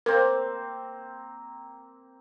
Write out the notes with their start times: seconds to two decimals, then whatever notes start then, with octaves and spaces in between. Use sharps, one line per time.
0.06 A#3 C4 A#4